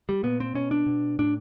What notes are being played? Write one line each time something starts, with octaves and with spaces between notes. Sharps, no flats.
G3
A#2 B3
C4
B2 C#4
D4
B2
A2 D4